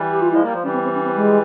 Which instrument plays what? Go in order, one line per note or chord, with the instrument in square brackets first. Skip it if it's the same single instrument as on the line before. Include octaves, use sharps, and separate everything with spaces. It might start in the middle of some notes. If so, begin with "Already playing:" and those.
Already playing: [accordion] E3 G3
[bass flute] G4
F4
[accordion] F3 G#3 [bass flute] E4
[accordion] G3 A#3
F3
[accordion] E3 G3 [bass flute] C#4
[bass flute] C4
C4
C#4
C4
G#3